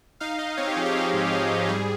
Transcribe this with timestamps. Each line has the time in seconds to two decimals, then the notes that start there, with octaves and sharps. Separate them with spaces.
0.20 D#4 F5
0.39 D#4 D#5
0.57 C4 C#5
0.67 G4
0.76 F3 G#4
0.86 G4
0.95 C4
1.13 G#2
1.32 C4 G#4
1.51 G#2
1.69 G3 G#4